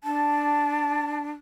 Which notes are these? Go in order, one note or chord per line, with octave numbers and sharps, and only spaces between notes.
D4 A5